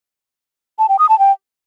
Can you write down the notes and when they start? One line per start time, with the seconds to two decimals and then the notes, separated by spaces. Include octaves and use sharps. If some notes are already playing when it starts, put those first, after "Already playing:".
0.79 A5
0.89 G5
0.99 D#6
1.09 A5
1.19 G5